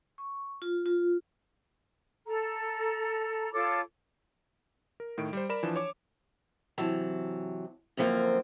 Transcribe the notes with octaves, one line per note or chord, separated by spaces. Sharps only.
C#6
F4
F4
A4 A#5
F4 A4 C#5 D6
A#4
A2 D#3 D7
G3 C5
A#4 D5 B5 E7
E3 F3 D4
C#5 D6
C3 E3 F#3 A5
F#2 D3 F3 G#3 A#3 C4